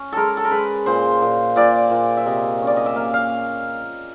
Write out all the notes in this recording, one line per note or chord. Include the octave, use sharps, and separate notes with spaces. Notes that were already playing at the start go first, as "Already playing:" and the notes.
Already playing: C#4
G#3 A4 A#4
A4
A#4
G#3 B4
A#2 C5
A#2
A#2 D5
A#2
E5
C3 D#5
C#4
D5
D#5
E5
A#3 F5
F5